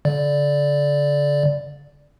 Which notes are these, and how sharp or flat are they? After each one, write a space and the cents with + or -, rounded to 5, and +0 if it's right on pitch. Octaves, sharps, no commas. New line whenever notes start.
D3 -40 D5 +0